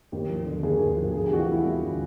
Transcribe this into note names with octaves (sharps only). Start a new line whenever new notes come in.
D#2 G4
F3
D3
D#2 G#4
D#2
F3
D2 G#4
G4
E3 F#4
F4
C3 E4
G3
D2